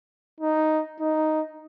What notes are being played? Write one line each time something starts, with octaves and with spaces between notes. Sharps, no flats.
D#4
D#4